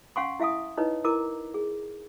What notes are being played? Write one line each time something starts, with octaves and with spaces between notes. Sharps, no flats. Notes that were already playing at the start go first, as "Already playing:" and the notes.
C#4 F5 F#5 G#5 C6 C#6
E4 E5 F5 G#5 D#6
D#4 E4 B4 C#5 D#5
E4 A#4 A#5 D6
G#4